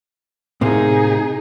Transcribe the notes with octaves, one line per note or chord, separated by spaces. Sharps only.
A2 C3 A#3 D#4 G#4